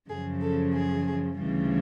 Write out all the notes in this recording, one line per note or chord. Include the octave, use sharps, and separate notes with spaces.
F#2 C#3 F3 G#4
A4
G#4
D2 C#3 E3 G3